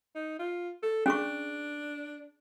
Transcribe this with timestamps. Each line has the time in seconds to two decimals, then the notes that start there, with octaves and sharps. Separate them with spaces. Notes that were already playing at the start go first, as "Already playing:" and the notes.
0.15 D#4
0.39 F4
0.83 A4
1.06 C#4 D4 G#4 C#6